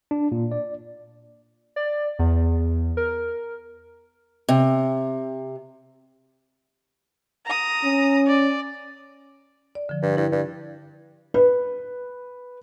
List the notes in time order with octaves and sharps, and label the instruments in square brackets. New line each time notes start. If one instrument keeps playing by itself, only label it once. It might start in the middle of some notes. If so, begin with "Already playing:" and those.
[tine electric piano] D4
A#2
D5
[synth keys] D5
E2
A#4
[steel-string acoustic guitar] C3
[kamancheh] A#5 D#6
[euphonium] C#4
[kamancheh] D5
[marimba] D5
D3 F3
[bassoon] G2
[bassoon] G2 [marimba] E4
[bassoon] G2
[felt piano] B4